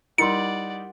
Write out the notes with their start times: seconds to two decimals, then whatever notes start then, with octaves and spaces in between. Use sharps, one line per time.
0.18 G3 D#4 E4 A#4 D5 F#5 C6 C#7